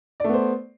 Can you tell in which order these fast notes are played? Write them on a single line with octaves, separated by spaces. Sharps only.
D5 A3 B3 C5